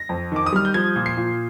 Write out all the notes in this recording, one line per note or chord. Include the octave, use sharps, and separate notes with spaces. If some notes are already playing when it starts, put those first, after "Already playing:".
Already playing: A#6
F2
D#3 D6
D#6
G3 F6
G6
F3 G#6
A#2
C7
A#2